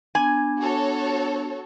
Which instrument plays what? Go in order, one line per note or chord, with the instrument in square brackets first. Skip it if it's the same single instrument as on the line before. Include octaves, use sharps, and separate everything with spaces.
[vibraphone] B3 D4 [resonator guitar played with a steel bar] G#5
[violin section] F#4 A4 C#5